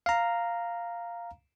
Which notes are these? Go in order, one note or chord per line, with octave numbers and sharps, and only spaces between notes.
F5 A#5